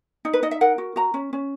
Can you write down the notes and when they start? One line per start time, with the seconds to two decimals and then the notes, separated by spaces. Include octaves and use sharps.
0.25 D#4
0.33 B4
0.43 D#4 D#5
0.51 E5
0.61 A#4 F#5
0.78 F#4
0.96 F#4 A#5
1.14 C#4
1.33 C#4